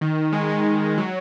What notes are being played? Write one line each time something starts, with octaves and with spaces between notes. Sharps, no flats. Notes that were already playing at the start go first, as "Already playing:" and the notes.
D#3
G#3
G#3
F#3